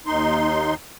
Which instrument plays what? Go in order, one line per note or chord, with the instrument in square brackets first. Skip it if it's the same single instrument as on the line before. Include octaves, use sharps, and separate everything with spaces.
[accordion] D#2 D#4 C6